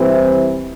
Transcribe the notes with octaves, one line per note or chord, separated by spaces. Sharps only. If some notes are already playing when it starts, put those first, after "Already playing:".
Already playing: C2 C3 E3